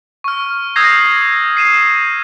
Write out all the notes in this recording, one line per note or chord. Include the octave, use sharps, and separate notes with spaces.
C#6 F6
D#6 E6 G6 G#6 A#6 C7
C7 D#7 E7